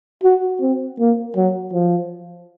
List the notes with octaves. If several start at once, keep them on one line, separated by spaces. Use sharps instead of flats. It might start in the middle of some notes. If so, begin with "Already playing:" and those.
F#4
C4
A#3
F#3
F3